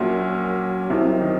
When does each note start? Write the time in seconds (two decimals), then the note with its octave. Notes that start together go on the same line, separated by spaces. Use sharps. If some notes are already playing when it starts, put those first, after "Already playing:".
Already playing: A#1 A#2 F#3 A#3 C#4 F#4
0.90 C2 C3 F#3 C4 D#4
1.21 D#3